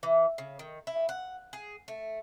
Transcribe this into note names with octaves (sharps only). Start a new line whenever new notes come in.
E3
C#3
D#3
E4
F#5
G#4
A3